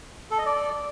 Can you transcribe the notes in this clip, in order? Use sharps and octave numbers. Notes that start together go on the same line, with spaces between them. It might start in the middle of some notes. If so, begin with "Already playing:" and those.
A4
D#5
D5